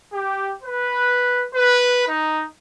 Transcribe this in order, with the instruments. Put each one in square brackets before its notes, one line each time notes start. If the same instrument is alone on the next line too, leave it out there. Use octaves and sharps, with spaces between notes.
[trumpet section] G4
B4
B4
D#4